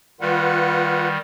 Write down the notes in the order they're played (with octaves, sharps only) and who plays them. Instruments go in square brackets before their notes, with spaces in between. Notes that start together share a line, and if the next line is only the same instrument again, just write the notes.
[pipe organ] D#3 G3 [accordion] F4 B4 F#5